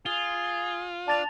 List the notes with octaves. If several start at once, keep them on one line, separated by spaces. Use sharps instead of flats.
F4 G#4 G7
D4 D5 A5 A6 F7